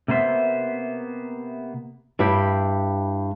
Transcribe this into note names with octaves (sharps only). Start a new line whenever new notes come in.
C3 A#3 B3 C5 E5
G2 E4 G4